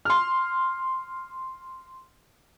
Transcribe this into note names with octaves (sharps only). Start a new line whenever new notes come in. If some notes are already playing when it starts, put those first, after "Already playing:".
C6 F6